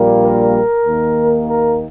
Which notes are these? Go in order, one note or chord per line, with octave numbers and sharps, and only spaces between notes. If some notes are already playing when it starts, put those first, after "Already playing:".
Already playing: A#1 A#2 G3 A#3
A#4
D#2 D#3 A#3
A#4